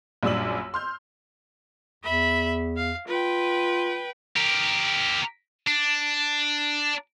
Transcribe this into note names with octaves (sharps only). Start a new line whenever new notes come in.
A#1 F#2 G3 D4 E6 F#7
C6 F6 G6
E2 E5 B5
F5
F4 B4 G5
G4 A#4
D4